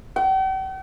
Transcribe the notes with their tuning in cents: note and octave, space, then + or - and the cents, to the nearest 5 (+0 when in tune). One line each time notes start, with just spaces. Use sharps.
G5 -45